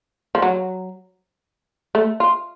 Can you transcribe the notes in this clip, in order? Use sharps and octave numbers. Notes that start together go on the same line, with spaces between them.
F3
F#3
A3
F4